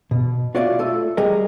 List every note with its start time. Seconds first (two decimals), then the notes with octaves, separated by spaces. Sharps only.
0.11 B2
0.55 F4 F#4 C#5 D5 E5 F5
0.79 A3 F4 A4
1.17 G3 G#4 A#4 D#5